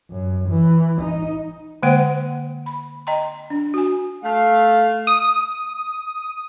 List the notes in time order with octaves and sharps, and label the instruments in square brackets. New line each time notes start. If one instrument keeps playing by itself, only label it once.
[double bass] F#2
E3
D#4
[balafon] D3 G#3 A#3 C5 F#5 G5
B5
D#5 G5 A#5 C6
D4
F#4 G#5
[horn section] A3 F5
[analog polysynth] D#6